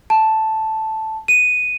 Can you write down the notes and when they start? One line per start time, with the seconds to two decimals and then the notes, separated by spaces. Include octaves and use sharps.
0.10 A5
1.28 D#7